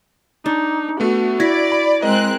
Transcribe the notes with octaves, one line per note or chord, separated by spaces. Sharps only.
D4 D#4
A3 B3 F#4
E4 D5 G#6 A#6 B6
B5
G#3 C4 A#4 D#5 F#6